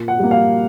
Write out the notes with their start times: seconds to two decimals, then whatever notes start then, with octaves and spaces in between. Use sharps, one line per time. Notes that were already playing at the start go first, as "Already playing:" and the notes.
Already playing: A#2
0.08 F#5
0.19 G3 A#3
0.31 F5